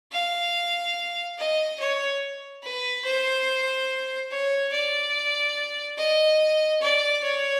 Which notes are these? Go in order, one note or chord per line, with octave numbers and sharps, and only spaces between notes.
F5
D#5
C#5
B4
C5
C#5
D5
D#5
D5
C#5